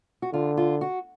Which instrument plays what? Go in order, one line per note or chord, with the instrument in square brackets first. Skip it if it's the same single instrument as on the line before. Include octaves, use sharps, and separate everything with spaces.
[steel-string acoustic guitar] F#4
[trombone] D3 [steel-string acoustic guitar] F4
[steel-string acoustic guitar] F4
F#4